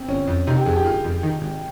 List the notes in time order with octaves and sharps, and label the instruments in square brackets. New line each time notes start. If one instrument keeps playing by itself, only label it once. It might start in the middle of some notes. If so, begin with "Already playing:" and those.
Already playing: [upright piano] C4
[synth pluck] G1 [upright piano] C#4
[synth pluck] F2
[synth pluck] C3 [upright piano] D#4
[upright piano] G4
[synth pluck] F2 [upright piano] G#4
[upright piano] G4
[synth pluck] G1 [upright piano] F4
[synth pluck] F2
D#3
G#1